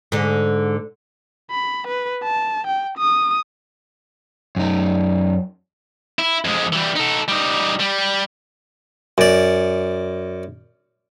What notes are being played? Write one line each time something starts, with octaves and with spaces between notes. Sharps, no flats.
G#2 D3
B5
B4
A5
G5
D#6
F#2 D#4
E4
F2 G#3
E3 G3
D#4 A4
G3 D#4
G3
F#2 D5